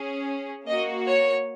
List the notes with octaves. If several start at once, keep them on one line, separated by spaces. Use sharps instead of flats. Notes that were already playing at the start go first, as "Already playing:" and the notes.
Already playing: C#4 G#4
A#3 F#4 D#5
C#5